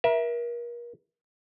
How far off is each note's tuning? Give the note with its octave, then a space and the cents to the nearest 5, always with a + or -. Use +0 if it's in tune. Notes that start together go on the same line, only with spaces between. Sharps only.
A#4 +35 E5 +0